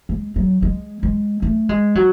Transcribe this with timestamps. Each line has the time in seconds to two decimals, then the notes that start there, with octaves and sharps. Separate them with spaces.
0.09 G#3
0.36 F#3
0.62 G#3
1.03 G#3
1.42 A3
1.69 G#3
1.95 F#3